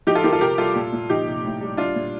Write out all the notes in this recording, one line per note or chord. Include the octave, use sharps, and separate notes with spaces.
F3 D#4 G4
F4 A4
F3 G4 A#4
F4 A4
C3 G4 A#4
G3 F4 A4
A#2
A#2
F3 D#4 G4
C3
A2
G3
G3 D4 F4
A#2